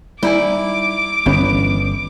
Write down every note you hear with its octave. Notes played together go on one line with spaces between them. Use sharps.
G3 D#4 E4 G#5 D6
G1 G2 D#3 E3 B3 C#4